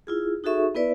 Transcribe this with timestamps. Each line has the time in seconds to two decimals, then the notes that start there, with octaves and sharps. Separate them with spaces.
0.07 E4 F4 G#4
0.44 D#4 F#4 G#4 A4 E5 C#6
0.75 B3 E4 B4 D5 E5